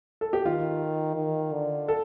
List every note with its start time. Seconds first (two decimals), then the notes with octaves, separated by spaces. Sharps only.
0.21 A4
0.33 G4
0.45 D#3 F4
1.16 D#3
1.53 D3
1.88 A4